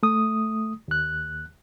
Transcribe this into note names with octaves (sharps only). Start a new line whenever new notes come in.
A3 D#6
D#2 F#6